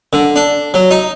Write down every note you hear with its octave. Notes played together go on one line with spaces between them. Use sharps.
D3
D4
F#3
D#4